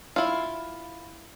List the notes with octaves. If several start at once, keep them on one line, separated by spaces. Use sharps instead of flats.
E4 F4